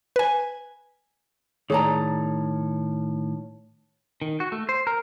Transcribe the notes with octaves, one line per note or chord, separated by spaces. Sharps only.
B4 G#5
A2 D#3 G#4 C#5 D5 A5 A#5
D#3
F#4
A3
C5
A#4